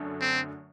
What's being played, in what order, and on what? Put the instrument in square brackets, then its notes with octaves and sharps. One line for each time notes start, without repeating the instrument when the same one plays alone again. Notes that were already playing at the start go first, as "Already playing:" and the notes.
Already playing: [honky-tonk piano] F#2 D3 F#3 A3
[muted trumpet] C4